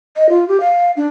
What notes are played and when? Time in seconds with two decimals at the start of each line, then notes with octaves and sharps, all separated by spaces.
0.16 D#5
0.29 F4
0.48 G4
0.60 F5
0.97 D4